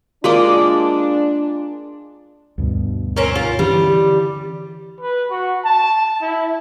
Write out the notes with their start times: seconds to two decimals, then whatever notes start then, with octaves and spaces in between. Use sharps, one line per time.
0.24 G#3 A#3 D4 F4 D5
2.58 D2 G2 B2
3.16 C4 C#4 A#4
3.36 F4
3.59 D3 E3 G3 C#4
5.01 B4
5.31 F#4
5.65 A5
6.22 E4